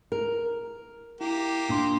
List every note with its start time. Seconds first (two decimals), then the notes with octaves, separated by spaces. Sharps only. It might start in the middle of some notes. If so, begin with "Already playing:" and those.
0.12 A#4
1.21 A#3 E4 G4
1.69 A#2 D4 C6